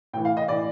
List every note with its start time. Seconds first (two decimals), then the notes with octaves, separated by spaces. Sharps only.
0.13 A2 G5
0.17 E3
0.25 F5
0.37 D#5
0.48 A2 E3 D5